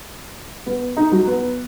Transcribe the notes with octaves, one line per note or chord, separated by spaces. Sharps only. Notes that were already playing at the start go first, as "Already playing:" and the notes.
B3
D#4
F#3
B3